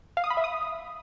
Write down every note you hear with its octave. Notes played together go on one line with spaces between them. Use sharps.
F5
D#6
B5
E5
D#6